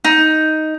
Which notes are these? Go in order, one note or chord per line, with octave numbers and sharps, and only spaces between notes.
D#4